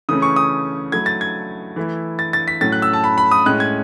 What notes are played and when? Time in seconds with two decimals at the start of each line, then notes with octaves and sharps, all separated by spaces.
0.09 C#3 E3 A3 C#4 D#6
0.22 C#6
0.36 D#6
0.92 F#3 A3 E4 G#6
1.06 A6
1.21 G#6
1.76 E3 A3 E4
2.19 A6
2.33 A6
2.48 B6
2.61 A2 F#3 A3 C#4 A6
2.72 F#6
2.82 E6
2.93 A5
3.04 B5
3.18 B5
3.31 D#6
3.46 A2 G#3 C#4 F#6
3.60 G#6